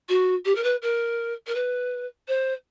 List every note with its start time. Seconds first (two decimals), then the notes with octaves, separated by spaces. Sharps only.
0.09 F#4
0.45 G4
0.55 A#4
0.63 B4
0.82 A#4
1.47 A#4
1.55 B4
2.28 C5